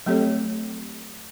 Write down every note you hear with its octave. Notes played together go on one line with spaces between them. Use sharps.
F#3 A3 C4 G4 A4 C#5